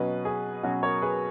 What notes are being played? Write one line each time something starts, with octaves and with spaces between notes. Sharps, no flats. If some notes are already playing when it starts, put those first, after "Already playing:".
Already playing: B2 F#3 C#4 B4 D#5
G#4
B2 F#3 C#4 F#4
A#4 C#5
G#4 B4